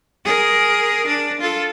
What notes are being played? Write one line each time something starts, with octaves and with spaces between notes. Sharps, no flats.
G#4 A#4
D4
F4 A4